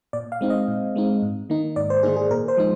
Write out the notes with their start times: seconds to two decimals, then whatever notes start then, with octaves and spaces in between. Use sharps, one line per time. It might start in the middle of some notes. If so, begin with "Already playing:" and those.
0.13 A#2 D5
0.32 F5
0.41 G#3 C4 D#4
0.50 D#5
0.68 A#2
0.96 G#3 C4 D#4
1.22 G#2
1.50 D#3 A#3 D#4
1.76 G#2 D5
1.90 C5
2.03 D#3 A#3 D#4 G#4
2.16 G#4
2.31 A#2 A#4
2.48 C5
2.57 F3 G#3 D#4